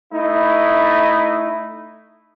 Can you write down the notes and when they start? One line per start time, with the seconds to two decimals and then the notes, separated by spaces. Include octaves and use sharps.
0.12 A3 D#4 E4